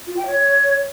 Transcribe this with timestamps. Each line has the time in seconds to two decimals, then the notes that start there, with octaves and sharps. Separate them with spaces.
0.07 F4
0.17 G5
0.27 C#5